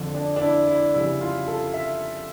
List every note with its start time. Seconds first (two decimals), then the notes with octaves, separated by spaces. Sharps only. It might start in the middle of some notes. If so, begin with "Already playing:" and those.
Already playing: F2 D3 F3
0.15 D4
0.36 D4
0.41 E4
0.67 E4
0.94 F2 C#3 G3 E4
1.21 F4
1.47 A4
1.74 E5